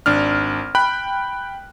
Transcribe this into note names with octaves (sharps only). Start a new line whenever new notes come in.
G#1 D4 F6
G5 B5 F#6